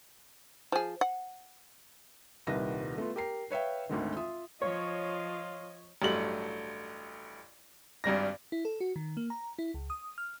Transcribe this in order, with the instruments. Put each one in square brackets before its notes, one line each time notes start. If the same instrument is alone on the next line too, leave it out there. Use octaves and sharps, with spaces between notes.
[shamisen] F3 G#4
F#5
[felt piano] D#1 C2 D#3 B4 A#6
A3 B3 F4
G4 A#4 C7
B4 C#5 E5 F5 G5
G#1 D2 D3 D#3
F4 E5 D#6
[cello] F3 [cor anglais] F4 [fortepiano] C#5 [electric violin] D#5
[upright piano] A1 G2 F#3 A3 F#7
G#1 G2 G3 A#6
[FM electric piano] E4
A4
F#4
D#3
A#3
A#5
E4
C#2
D#6
F6